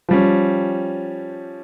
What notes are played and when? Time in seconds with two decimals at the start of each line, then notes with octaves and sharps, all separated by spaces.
0.09 F3 G3 C#4